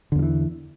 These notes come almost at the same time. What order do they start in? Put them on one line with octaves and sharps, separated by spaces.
D3 E2 F3 E3